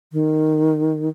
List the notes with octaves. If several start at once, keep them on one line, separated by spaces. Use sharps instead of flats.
D#3